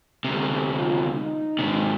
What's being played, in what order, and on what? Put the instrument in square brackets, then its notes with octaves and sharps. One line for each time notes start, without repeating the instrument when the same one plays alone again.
[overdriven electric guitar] D2 C3 [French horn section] A3 G4
[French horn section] F4
D#4
[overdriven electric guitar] G#2 C3